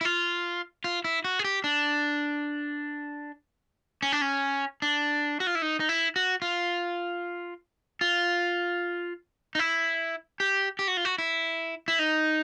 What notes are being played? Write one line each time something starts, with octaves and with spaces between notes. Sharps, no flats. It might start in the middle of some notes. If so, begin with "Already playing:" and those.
E4
F4
F4
E4
F#4
G#4
G4
D4
C#4
D4
C#4
D4
F#4
F4
E4
D#4
D#4
E4
F#4
F4
F4
D#4
E4
G4
G4
F#4
F4
F#4
E4
E4
D#4